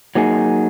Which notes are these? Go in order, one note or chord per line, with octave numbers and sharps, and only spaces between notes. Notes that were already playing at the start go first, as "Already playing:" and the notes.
F#3 A#3 D#4 G#4